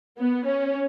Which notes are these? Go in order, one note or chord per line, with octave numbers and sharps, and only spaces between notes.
B3
C#4